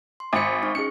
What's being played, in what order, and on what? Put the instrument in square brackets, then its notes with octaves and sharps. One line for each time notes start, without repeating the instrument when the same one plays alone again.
[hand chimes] C6
[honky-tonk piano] G#1 C#7 [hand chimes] G#5 B5 B6
[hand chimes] D#4 C#6
[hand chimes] C#4 G#4 [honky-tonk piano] C#7